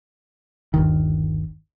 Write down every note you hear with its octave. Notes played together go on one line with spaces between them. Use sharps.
G1 D#2 D#3